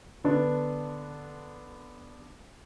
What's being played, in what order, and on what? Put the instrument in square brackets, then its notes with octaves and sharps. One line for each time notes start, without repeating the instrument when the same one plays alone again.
[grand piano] D3 B3 D4